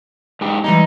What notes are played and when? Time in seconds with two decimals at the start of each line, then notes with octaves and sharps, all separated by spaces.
0.41 G#2 G4
0.64 E3 G3 G#3 D#4